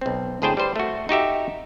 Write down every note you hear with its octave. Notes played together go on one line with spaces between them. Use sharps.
B1 C4
D2 A2 G#4 C5 G5 A5
G3 B4 C5
A3 F#4
D#4 F#4 G4 E5